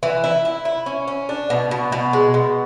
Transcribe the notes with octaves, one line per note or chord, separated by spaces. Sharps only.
E3
E4
E4
E4
C#4
C#4
D4
B2
B2
B2
G#3
B2